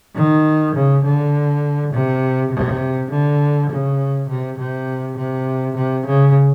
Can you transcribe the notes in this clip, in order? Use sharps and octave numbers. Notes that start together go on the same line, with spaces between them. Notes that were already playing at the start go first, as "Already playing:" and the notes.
D#3
C#3
D3
C3
C3
D3
C#3
C3
C3
C3
C3
C#3